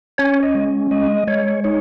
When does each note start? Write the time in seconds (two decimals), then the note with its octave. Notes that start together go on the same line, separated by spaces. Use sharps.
0.18 C#4 C#5
0.43 D#5
0.55 G#3
0.91 G#3 D#5
1.27 G#3 C#5
1.64 D#4 C#5